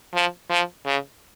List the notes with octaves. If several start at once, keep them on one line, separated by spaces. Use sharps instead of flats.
F3
F3
C#3